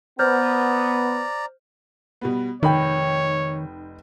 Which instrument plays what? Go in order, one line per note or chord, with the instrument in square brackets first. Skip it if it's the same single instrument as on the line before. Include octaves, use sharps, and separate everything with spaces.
[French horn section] B3 [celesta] C5 F6 G6 [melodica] D5 A#5
[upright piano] B2 G3 B3
[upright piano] F1 B5 [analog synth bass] D#3 [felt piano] D#4 G5 [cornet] C#5